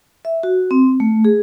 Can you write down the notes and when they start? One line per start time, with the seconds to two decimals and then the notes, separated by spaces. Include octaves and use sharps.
0.25 E5
0.43 F#4
0.71 C4
1.00 A3
1.25 G#4